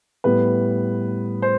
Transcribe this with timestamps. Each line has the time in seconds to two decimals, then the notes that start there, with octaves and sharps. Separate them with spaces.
0.24 A2 G3 B3 B4
1.42 C5